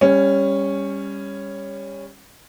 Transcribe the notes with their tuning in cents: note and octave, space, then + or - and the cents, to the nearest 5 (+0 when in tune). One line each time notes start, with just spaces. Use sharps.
G3 +25 C#4 -5